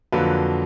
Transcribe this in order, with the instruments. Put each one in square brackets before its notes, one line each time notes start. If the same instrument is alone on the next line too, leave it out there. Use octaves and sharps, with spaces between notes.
[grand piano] F2 D3 F#3 A#3 B4